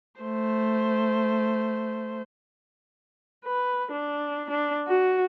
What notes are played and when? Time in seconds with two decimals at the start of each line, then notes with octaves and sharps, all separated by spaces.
0.21 A3 C5
3.46 B4
3.92 D4
4.50 D4
4.88 F#4